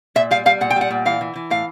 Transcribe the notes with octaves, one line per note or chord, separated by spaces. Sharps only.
A#2 E5
G3 F5
G3 F5
A#2 F#5
G5
G3
F#5
A#2
E3 F5
E3
E3
A2 F5